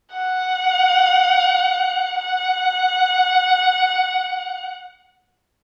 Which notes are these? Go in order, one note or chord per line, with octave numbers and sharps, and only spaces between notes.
F#5
F#5